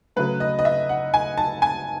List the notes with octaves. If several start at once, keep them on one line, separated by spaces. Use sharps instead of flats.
C#3 F#3 A3 B4
D#5
D#5
E5
F#5
G#5
A5
G#5